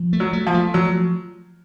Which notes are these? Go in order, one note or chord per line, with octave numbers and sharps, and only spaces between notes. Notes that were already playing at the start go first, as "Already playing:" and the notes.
Already playing: F3
A3
F#3
A3
F3
A3
F3 F#3